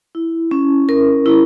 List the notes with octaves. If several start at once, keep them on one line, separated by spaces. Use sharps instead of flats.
E4
C#4
A#4
E4